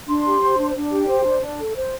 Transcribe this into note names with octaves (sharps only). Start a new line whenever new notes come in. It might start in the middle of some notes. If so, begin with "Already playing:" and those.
D4 C6
G4
C5
D4
D4
G4
C5
D4
D4
A4
C5